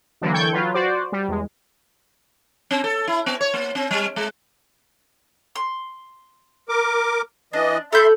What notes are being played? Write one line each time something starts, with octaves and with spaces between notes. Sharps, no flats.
D3 E3 F#3 A#3
E3 A4 G5 C#6 G6 G#6
F#3 F4 B4
F#4 C5 D5
G3
E2 G#3
C4
A4
E4
B3
C#5
A#3
C4
G3
G#3
C6
A#4 D6
E3 D4 D#5
A4 E5 B5 C6 G6